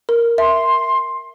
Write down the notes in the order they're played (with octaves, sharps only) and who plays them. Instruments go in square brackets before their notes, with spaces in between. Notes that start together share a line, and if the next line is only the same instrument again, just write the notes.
[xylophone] A#4
[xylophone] E5 [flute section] C6